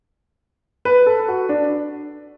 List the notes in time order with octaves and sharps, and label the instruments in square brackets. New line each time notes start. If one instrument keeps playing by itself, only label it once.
[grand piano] B4
A4
F#4
D4